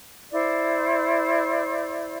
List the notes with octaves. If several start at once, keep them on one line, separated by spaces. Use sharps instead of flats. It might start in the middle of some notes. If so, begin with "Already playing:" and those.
E4 C5 D5